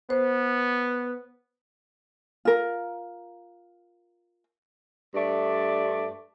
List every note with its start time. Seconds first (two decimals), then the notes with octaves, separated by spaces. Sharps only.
0.10 B3 C5
2.45 F4 A#4
5.15 G2 A3 D5